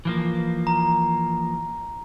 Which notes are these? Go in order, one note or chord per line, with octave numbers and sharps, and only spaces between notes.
E3 F3 A#3
A#5